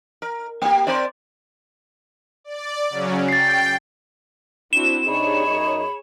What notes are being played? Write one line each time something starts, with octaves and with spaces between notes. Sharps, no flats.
A#4
A#3 G4
C4 C5 D5
D5
C#3 F#3 C#4
G5 A6 C7
C4 D4 E4 F#4 E7
C3 D4 D#4 G#4 C#5 B5
F#2 D#4 D#5